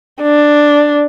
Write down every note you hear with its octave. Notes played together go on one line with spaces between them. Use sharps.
D4